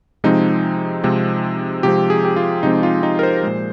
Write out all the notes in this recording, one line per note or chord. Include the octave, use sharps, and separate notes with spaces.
C3 F3 G#3 C4 D#4
C3 F3 G#3 C4
C3 F3 G#3 C4 G4
G#4
G4
F4
C3 F3 G#3 C4 D#4
F4
D#4
A#4
C5
A#2 F3 G#3